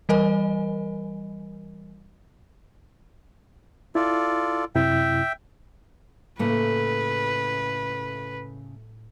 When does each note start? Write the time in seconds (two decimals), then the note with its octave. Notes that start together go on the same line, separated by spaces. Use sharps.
0.09 E3 G3 A#4 D#5 G#5
3.95 E4 F4 A4 D5
4.75 F#2 C3 E4 E5 G5
6.39 A2 C#3 A3 A#3 B4